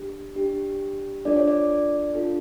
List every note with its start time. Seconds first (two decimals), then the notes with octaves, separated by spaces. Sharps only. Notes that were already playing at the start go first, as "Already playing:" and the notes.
Already playing: D4 G4
0.35 D4 G4
1.25 D4 F4 A4 D5
1.36 C#5
1.48 D5
2.15 D4 F4 A4